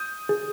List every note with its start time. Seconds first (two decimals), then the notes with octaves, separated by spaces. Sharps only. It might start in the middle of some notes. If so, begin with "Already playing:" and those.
Already playing: D#6 G6
0.29 G#4